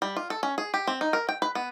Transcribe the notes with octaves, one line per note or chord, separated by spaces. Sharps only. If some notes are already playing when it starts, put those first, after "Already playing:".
G3
F4
A4
C#4
G#4
G4
C4
D#4
A#4
G5
B4
B3